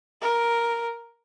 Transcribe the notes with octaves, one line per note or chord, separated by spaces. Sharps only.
A#4